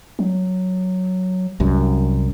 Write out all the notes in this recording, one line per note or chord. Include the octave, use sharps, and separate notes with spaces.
F#3
C2 F#2